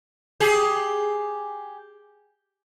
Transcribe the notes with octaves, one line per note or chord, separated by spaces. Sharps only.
G4 G#4